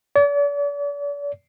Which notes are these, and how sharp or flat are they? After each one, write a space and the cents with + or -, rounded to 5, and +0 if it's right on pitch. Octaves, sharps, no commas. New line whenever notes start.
D5 -40